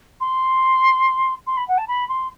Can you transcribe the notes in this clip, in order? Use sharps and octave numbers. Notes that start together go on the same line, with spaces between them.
C6
C6
B5
F#5
A5
B5
C6